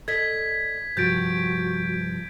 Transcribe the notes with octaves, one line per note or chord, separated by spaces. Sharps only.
A4 D5 D#5 G#6 B6
G2 C3 F3 F#4 G6 A6 D7